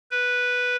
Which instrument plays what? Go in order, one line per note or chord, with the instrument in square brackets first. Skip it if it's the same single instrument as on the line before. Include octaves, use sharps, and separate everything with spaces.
[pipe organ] B4